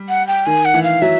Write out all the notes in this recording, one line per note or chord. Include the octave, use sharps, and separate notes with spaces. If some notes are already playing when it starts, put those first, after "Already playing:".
Already playing: G3
F#5
G5
D#3 G#5
F#5
E3
F5
F#3 E5